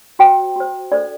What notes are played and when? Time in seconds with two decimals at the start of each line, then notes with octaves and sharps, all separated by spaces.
0.19 F#4 C5 G5
0.56 F#4 C5
0.92 D4 A4 C5 D5